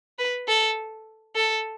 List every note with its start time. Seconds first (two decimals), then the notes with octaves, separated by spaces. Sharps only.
0.19 B4
0.48 A4
1.36 A4